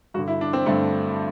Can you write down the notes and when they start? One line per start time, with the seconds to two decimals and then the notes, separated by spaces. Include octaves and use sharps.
0.14 G2 F#4
0.18 D3
0.28 E4
0.41 D4
0.53 C4
0.66 G2 D3 A3